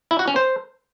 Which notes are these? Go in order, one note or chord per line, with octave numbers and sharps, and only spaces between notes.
E4
F#4
C#4
C5